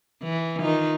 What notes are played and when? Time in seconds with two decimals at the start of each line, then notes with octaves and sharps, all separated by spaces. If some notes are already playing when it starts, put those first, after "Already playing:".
0.23 E3
0.60 D#3 D#4 F4